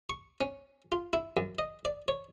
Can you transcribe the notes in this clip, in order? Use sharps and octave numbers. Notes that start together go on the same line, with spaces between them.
C#6
C#4
F4
E4
F#2
D#5
D5
C#5